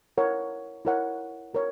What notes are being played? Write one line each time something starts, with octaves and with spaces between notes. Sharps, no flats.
E4 A#4 C#5 F#5
E4 A#4 C#5 F#5
F#4 A#4 C#5